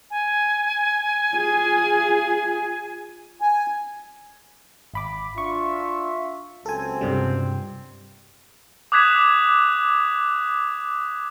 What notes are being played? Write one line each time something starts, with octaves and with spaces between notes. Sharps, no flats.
G#5
F4 G#4
G#5
G#1 B5 D6
D4 F4 E5 C#6
C#2 F#3 C4 A4 G#5
G2 C3 G3
D6 D#6 F#6 G#6 B6 E7